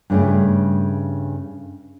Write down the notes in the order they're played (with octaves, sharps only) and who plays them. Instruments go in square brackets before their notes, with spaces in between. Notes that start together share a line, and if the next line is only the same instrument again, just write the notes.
[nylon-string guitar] G2 C#3 A3